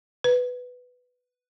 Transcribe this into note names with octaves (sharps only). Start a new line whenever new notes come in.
B4